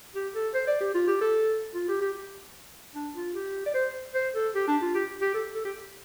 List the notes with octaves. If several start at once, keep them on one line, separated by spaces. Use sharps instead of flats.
G4
A4
C5
D5
G4
F4
G4
A4
F4
G4
G4
D4
F4
G4
D5
C5
C5
A4
G4
D4
F4
G4
G4
A4
A4
G4